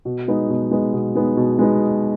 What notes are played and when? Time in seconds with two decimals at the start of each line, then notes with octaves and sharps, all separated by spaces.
0.05 B2
0.28 G#3 B3 D#4
0.49 B2
0.71 G#3 B3 D#4
0.94 B2
1.15 G#3 B3 D#4
1.37 B2
1.59 G#3 B3 D#4